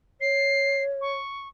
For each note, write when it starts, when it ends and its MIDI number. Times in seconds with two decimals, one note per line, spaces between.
0.21 1.13 73
0.21 0.83 96
1.01 1.48 85